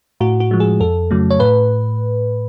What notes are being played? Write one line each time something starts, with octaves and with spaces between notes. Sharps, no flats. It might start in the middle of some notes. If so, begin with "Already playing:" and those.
A2 F#4
F#4
F3 G#3
G#4
F2 A4
C#3 F#3 A3
C#5
A2 B4